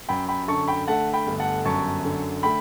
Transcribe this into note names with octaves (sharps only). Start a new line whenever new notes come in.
F#2 G5 B5
G5 B5
D3 A5 C#6
G5 B5
A3 F#5 A5
G5 B5
G1
F#5 A5
F#2 A5 C#6
D3
A3 G5 B5